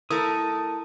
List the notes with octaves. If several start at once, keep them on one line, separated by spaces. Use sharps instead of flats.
A3 E4 A4 A#4 D#6